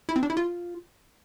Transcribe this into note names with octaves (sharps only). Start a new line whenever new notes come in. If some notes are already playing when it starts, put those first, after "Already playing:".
E4
C4
D4
E4
F4